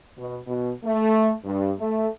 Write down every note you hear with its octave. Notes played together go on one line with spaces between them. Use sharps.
B2
B2
A3
G2
A3